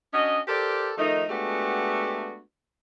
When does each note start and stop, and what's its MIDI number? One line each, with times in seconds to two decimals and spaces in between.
0.14 0.39 61
0.14 0.39 62
0.14 0.39 66
0.14 0.39 75
0.48 0.91 67
0.48 0.91 69
0.48 0.91 70
0.48 0.91 72
0.48 0.91 74
0.98 1.23 51
0.98 1.23 53
0.98 1.23 57
0.98 1.23 63
1.29 2.39 56
1.29 2.39 57
1.29 2.39 59
1.29 2.39 62
1.29 2.39 66
1.29 2.39 67